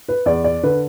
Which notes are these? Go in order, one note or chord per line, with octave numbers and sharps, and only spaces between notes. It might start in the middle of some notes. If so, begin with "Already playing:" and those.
B4
E2 D5
D5
D3 B4